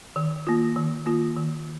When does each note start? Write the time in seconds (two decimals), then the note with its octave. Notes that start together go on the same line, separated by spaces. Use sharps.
0.16 D#3
0.47 A#3 F4
0.76 D#3
1.06 A#3 F4
1.36 D#3